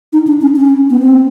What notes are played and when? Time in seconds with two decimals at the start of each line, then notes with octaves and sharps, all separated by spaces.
0.13 D#4
0.27 D4
0.41 C#4
0.56 C#4
0.90 B3
1.00 C4